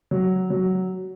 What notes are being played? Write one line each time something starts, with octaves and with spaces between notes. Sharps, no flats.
F#3
F#3